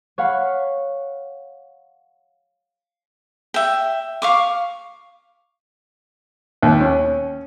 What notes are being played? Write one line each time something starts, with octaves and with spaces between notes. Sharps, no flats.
C#5 F5 F#5 B5
E5 G5
F5 C#6 D6
D#2
C#4